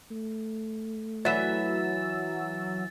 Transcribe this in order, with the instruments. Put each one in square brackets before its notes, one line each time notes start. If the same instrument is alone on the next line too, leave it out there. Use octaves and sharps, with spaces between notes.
[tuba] A3
[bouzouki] E3 E5 [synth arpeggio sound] F#3 F#4 E6 [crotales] A6